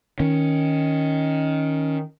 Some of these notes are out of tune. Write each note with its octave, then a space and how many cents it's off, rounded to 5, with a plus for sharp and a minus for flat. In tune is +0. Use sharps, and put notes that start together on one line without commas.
D#3 +10 C#4 +0